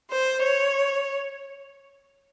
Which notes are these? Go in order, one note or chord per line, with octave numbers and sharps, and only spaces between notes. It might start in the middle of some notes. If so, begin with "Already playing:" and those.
C5
C#5